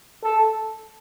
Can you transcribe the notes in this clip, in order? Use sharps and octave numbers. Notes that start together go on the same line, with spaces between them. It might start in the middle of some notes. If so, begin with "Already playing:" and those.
A4